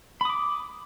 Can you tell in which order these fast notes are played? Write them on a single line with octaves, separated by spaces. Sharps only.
B5 D#6 D6